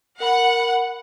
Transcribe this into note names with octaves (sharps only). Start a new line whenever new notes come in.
A#4 F#5 B5